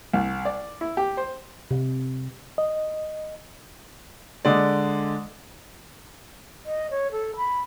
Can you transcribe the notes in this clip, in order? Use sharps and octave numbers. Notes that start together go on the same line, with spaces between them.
C2
D5
E4
G4
C5
C3
D#5
D3 G#3 D5
D#5
C#5
A4
B5